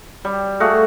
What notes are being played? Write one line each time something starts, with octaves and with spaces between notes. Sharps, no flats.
G3
A3 F#4 G#4 F5